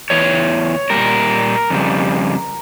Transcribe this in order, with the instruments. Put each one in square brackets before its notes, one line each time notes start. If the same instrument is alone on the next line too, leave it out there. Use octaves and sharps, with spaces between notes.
[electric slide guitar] E2 E3 C#5
A#2 G3 A#4
F2 C#3 G3